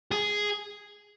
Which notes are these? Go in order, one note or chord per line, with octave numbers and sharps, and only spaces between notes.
G#4